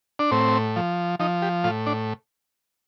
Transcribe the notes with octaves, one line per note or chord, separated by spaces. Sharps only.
D4
A2 C4
F3
F3 D#4
G4
A2 F4
D4